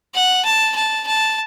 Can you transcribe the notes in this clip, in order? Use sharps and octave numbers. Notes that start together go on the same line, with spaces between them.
F#5
A5
A5
A5